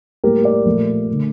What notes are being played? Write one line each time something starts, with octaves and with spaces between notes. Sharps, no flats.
A2 G3 A#3 G4 A#4
A#4 D5
A#2 F3 A3
D3 A3